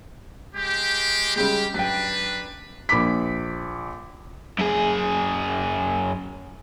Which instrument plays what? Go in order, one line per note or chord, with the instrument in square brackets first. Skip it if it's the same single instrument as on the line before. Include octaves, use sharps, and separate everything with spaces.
[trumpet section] G#3 G4
[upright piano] C#3 G3 G#3 [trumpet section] G4
[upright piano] F#2 G5 [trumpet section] D4 B4
[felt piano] A#1 B5 D6 B6
[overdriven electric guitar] F#2 G#4